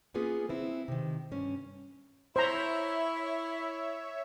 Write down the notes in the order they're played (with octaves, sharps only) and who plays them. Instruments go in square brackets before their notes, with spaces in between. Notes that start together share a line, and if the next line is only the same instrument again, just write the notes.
[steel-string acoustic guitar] A#3 B3 C#4 F4 G#4
B3 C4 E4
C3 D#3
G2 C#4
[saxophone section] E4 [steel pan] C5 A#5 [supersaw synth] C#5 E5